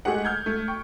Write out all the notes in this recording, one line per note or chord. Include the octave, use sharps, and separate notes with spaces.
G#3 A3 G4 G#4 F#5
F6 G6 G#6
A3
G5 C#6